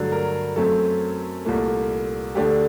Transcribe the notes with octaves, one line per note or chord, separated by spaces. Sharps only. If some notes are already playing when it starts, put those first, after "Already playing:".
Already playing: G2 D3 F#3 A3
A#4
F#2 F#3 A3 C4 A4
C2 A#2 A3
D2 D3 A3 D4 G4